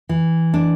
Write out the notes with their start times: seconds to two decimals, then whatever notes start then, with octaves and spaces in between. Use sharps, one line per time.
0.09 E3
0.54 D4